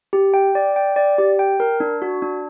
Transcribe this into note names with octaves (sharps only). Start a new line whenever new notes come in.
G4
G5
D5
G5
D5
G4
G5
A#4
D4
F#4
D4